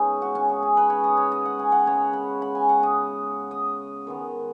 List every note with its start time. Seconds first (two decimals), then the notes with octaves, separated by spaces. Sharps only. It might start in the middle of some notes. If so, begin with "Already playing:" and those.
Already playing: C#3 G#3 B3 C#4 D#4 G#4
0.22 F#4
0.35 C#4
0.49 D#4
0.63 G#4
0.77 B4
0.90 C#5
1.04 D#5
1.17 C#5
1.32 D#5
1.45 F#5
1.59 G#5
1.72 F#5
1.86 C#3 G#3 B3 C#5
2.13 B5
2.42 B5
2.55 G#5
2.69 F#5
2.83 D#5
3.51 D#5
4.07 D#3 G#3 B3